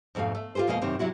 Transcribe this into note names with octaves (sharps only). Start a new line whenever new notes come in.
F2 G#2 B2 A3 F5
A3
F4 G4 G#4 B4 C5
F2 B2 G#3 A#3 D#5 F5
F#2 C3 D#3 C4
C3 F#3 E4 F#4